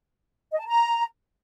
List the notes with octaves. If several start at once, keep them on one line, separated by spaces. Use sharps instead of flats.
D#5
A5
A#5